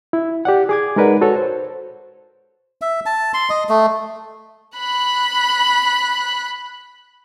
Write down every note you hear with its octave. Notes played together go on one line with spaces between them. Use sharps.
E4
G4 D5 F#5
G#4 D6 G#6
G#3 D#4 A#4 B4 D5 F#5
F#4 A4 B4 C#5
C5
E5
A5
C6
D#5
A3
B5 F#6